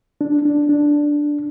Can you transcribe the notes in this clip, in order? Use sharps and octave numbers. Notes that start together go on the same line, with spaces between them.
D4
D4
D4